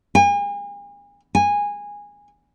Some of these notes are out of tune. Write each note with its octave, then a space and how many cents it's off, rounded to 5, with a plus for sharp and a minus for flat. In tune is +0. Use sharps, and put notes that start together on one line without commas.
G#5 -40
G#5 -15